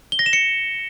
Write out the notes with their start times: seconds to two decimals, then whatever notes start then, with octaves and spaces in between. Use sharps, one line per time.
0.12 G7
0.19 A#6
0.26 E7
0.33 C#7